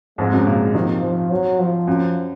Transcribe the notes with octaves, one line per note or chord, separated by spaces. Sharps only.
F2 G#2 G#3
F#2
A#2 C#3
C3 D#3 F3
F3
F#3
F3
F#2